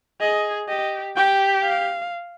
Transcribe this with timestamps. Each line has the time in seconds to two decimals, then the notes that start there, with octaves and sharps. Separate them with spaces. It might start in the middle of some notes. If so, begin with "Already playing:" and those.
0.21 G#4 D#5
0.69 G4 D#5
1.16 G4 G5
1.64 F5